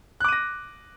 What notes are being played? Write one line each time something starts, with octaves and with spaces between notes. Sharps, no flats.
D6 F#6 A#6 D#7